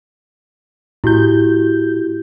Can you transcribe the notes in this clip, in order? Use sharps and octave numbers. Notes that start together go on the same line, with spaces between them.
A2 E4 F#4 G4 G6